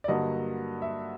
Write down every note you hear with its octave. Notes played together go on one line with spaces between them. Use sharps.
D5
G2 D3 F#3 A#3 D#5
E5